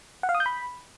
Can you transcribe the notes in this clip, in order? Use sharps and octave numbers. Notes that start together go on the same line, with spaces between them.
F#5
F5
D#6
G6
B5